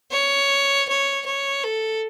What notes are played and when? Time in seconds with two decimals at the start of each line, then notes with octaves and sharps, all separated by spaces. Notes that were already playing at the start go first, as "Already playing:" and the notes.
0.11 C#5
0.88 C#5
1.26 C#5
1.64 A4